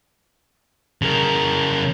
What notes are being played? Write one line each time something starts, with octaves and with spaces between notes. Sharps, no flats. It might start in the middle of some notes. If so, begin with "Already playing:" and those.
C#3 A#4